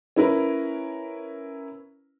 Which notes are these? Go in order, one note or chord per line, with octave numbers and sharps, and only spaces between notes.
C#4 E4 A#4 B4